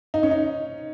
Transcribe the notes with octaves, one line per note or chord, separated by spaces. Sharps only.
D#4
C#4
D#4